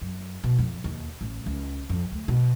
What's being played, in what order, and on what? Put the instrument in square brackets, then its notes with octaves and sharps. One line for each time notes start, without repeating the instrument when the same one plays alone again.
[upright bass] F#2
B2
F2
D#2
A1
C#2
F2
D2
B2